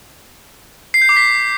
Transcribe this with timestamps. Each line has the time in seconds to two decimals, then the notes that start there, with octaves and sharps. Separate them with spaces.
0.94 C7
1.02 G6
1.09 D6
1.16 B6